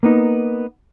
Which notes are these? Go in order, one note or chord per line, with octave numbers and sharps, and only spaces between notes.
A#3 B3 D#4